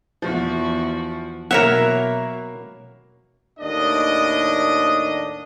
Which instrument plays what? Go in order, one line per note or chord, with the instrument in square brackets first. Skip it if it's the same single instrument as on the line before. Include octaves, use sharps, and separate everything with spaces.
[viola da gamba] E2 F#4 [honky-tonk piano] F3
[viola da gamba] B2 [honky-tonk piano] F#3 A#3 [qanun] A#4 C#5 E5 [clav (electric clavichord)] F#5
[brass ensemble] D#2 A2 D4 D#5